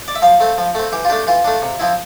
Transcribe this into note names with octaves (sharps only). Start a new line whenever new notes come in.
D5
E5
F3 F5
A3 C4
F3
A3 C4
E3 G4
F4
A3 D4 G4
E3 F4
A3 D4
C3
F3 C4 E4